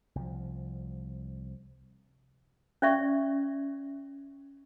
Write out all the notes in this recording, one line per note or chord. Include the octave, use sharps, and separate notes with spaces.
C2 F3
C#4 D5 E5 C#6